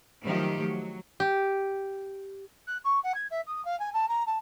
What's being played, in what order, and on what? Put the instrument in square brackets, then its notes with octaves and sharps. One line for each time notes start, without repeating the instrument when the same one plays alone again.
[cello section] D#3 F3 F#3 A3 G4
F#3
[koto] G4
[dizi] F#6
C#6
F#5
G#6
E5
D#6
F5
G#5
A5
A#5
A5